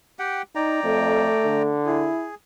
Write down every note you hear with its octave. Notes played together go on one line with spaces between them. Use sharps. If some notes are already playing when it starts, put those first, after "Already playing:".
G4 F#5 G5
D#4 D5 G5 A#5
F2 A3
D3
E4 G#4